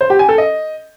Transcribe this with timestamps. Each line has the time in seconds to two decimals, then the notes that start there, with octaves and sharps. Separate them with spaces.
0.01 C5
0.10 G4
0.19 G#5
0.29 A4
0.38 D#5